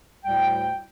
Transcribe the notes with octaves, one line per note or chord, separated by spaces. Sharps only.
D2 A2 G3 G5